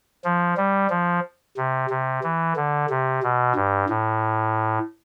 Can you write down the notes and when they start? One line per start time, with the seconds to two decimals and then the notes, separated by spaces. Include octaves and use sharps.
0.24 F3
0.57 G3
0.90 F3
1.57 C3
1.90 C3
2.24 E3
2.56 D3
2.90 C3
3.23 B2
3.55 G2
3.89 A2